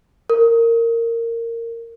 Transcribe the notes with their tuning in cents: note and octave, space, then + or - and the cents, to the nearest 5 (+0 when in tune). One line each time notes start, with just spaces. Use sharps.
A#4 -15